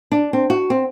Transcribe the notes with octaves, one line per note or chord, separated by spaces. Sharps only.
D4
C4
F#4
C4